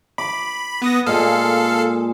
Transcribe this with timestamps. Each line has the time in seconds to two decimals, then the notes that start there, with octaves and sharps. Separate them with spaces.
0.18 B5 D6
0.82 B3 D#6 A#6
1.06 A#2 G#3 A4 F5